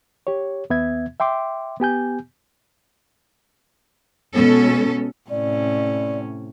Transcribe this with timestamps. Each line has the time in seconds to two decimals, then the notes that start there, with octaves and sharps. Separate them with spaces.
0.27 G4 C#5
0.70 D#2 B3 E5 G#6
1.20 E5 G5 C6 D6
1.80 B3 G4 G#5 G6
4.33 B2 G#3 B3 C#4 A4
5.30 A2 C3 C#4 D5